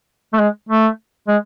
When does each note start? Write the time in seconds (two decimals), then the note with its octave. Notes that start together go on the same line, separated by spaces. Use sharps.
0.33 A3
0.39 G#3
0.69 A3
1.28 G#3